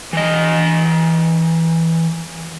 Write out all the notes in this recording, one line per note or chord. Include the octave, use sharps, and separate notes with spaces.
E3 D#5